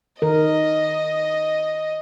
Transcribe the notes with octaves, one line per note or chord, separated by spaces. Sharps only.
D#3 A#4 D#5